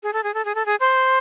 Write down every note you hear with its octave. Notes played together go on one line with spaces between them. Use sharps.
G#4
A4
G#4
A4
G#4
A4
G#4
C5